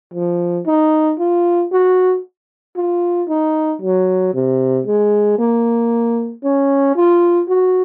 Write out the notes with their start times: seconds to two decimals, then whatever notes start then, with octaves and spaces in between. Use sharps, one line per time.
0.14 F3
0.67 D#4
1.19 F4
1.72 F#4
2.76 F4
3.29 D#4
3.82 F#3
4.34 C3
4.87 G#3
5.39 A#3
6.44 C#4
6.96 F4
7.49 F#4